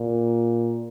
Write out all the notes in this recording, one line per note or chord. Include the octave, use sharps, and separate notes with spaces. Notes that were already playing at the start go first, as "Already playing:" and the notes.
Already playing: A#2